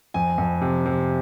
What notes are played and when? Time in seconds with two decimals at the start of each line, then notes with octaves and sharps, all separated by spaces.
0.14 F2 G#5
0.38 F2
0.62 C3
0.86 C3